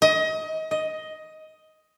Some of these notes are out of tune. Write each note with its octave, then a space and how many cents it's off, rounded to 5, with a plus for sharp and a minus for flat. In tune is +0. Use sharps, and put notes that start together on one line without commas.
D#5 +25
D#5 +10